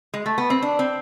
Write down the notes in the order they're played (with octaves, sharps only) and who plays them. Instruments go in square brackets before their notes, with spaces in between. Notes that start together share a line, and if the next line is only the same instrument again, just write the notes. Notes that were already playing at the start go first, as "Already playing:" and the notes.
[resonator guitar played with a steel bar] G#3
A3
B3
C4
D4
C4